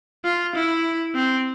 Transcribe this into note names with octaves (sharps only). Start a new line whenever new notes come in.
F4
E4
C4